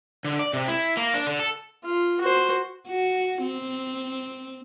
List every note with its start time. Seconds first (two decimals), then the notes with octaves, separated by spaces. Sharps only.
0.25 D3
0.39 D5
0.53 C3
0.68 E4
0.97 A#3
1.14 D4
1.27 D3
1.39 A4
1.84 F4
2.21 F#4 C5
2.88 F#4
3.41 C4